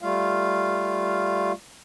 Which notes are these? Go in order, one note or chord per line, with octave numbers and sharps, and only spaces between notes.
G3 A3 F4 F5